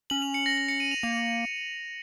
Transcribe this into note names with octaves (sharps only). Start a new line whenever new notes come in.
C#4 F#7
F7
C#7
A#6
A#6
C#7
D#7
F7
A#3 F7